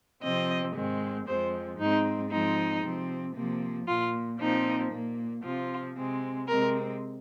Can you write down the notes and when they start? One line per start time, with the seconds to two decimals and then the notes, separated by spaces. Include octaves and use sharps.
0.23 C3 F3 C4 D#5
0.75 G#2 D#3 G#3 C4
1.26 F2 F3 G#3 C4 C5
1.78 G#2 G#3 C4 D#4
2.31 G#2 F3 G#3 C4 D#4
2.83 C3 F3 C4
3.36 C3 F3 A#3
3.87 A#2 A#3 F4
4.40 A#2 F3 C4 D#4
4.92 A#2 A#3
5.44 C3 F3 C4 F4
5.96 C3 G#3 C4
6.48 C3 G#3 C4 A#4